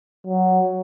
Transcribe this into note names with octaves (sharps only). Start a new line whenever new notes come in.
F#3